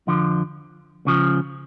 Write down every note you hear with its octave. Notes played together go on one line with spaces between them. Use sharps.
F2 D3 F3
C#2 C#3 F3